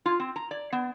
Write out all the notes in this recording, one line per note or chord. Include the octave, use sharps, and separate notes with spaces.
F4
C4
A#5
D5
B3